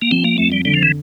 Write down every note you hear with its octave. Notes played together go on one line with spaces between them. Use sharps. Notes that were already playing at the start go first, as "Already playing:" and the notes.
A#3
F3 C4
A#3
F2 A3
G3
D3 G3
F3
E3